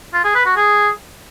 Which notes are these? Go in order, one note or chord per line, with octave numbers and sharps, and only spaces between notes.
F4
G#4
B4
F#4
G#4